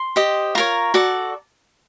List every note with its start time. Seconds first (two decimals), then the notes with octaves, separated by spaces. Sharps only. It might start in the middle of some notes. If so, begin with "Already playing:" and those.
Already playing: C6
0.16 G4 C5 D#5
0.55 F4 A#4 C#5 A#5
0.94 F#4 A4 D5